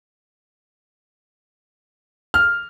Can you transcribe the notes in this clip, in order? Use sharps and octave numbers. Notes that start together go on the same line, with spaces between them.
F6